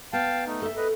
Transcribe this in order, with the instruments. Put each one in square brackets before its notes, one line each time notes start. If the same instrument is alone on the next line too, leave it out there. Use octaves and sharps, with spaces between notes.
[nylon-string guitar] B3 [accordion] F5 G5 A5
[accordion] A3 D#4
[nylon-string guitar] A4 E5
[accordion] B4 D#5